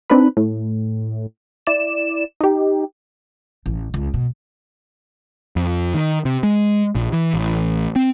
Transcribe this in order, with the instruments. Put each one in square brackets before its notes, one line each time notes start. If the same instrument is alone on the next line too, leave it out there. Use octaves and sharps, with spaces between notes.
[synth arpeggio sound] C4 D4 D#4 B4 B5
A2
E4 D5 E7
D#4 G4
[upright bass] A1
C#2
B2
[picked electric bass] F2
D#3
C3
G#3
A#1
E3
A1
C4